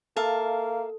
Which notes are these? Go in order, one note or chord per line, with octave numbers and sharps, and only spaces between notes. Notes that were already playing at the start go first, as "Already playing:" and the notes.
A#3 A4 E5 F5 A5